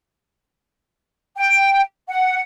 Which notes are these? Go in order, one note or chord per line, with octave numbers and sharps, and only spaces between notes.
G5
F#5